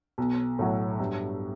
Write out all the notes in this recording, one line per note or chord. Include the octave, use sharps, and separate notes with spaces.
B1
A2 F#3
G2